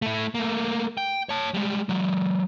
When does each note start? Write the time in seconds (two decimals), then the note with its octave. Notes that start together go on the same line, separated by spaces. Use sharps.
0.02 A3 E4
0.35 A3 A#3
0.97 G5
1.29 C#5 A5
1.54 G3 G#3
1.89 F#3 G#3